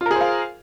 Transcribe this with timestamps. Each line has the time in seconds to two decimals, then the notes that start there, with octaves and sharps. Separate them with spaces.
0.01 F4
0.06 A#4
0.11 G#4
0.16 C5
0.21 F5